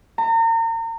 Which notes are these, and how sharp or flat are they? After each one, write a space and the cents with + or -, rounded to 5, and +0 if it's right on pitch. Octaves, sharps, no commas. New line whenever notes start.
A#5 -35